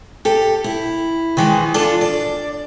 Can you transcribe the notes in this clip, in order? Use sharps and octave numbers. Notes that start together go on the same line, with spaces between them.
G4 A4
E4
D#3 E3 G#3
D4 F4 A4
D5